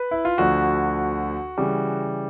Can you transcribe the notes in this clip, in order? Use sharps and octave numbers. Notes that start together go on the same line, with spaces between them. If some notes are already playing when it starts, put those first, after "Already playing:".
Already playing: B4
E4
F4
D2 D3 F3 F#4
C#3 E3 G3